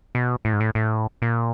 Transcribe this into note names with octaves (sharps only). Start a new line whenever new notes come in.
B2
A2
G#2
A2
A2
A#2